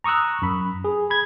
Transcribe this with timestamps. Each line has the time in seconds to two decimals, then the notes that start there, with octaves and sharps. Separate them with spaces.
0.04 A#5 C#6 D#6 E6 F#6
0.42 F#2 B5
0.84 G#4
1.10 B5 G#6